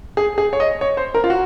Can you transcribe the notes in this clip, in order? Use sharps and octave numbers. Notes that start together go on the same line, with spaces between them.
G#4
G#4
C#5
D#5
C#5
C5
A#4
F4
F#4